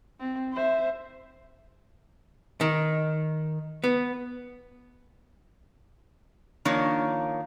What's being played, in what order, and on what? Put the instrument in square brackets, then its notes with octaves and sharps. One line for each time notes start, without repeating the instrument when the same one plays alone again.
[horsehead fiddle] C4
C5 E5
[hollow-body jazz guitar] D#3
B3
[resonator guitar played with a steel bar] D#3 F3 A#3 D4 C#5